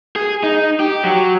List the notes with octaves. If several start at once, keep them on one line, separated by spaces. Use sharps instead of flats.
G#4
D#4
G4
F#3